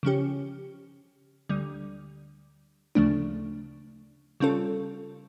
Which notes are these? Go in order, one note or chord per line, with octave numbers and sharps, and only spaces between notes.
C#3 F3 C#4 G4
D2 D3 G3
D2 C#3 F3 A3 D4
C#3 G3 C#4 F4 A4